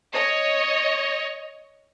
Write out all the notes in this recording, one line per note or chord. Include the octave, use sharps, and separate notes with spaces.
C#5 D#5